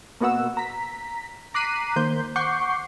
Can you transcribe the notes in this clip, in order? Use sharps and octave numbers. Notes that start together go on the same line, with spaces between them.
B2 A#3 B3 F#4 F#5 E6
A#5 B6
A#5 D6 F#6 B6 C7 D#7
D#3 A#3 C5 G6
F#5 C#6 D6 G6 C7